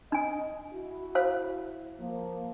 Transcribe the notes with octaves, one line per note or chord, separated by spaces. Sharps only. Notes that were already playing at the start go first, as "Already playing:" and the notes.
D4 D#5 G#5
E4 F#4
C5 F5
F3 A#3